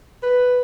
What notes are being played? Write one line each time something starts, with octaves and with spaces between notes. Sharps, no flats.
B4